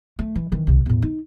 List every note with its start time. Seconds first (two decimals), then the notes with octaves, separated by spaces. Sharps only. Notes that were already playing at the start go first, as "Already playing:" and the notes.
0.19 A3
0.35 E3
0.52 D#3 E3
0.67 C2 C3
0.86 E2 A2
1.02 D#4